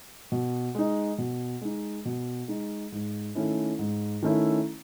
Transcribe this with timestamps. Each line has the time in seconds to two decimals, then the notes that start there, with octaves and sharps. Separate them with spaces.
0.32 B2
0.75 G#3 D#4
1.18 B2
1.61 G#3 D#4
2.05 B2
2.48 G#3 D#4
2.92 G#2
3.35 D#3 A3 C#4 E4
3.79 G#2
4.22 D#3 A3 C#4 E4